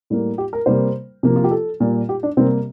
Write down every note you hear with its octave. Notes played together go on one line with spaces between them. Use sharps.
A2 G3 A#3
G4
A#4
C3 G3 A#3 C5
C3 F3 A#3
F4
G4
A4
A#2 G3 A#3
G4
D4
C3 G3 A#3 C4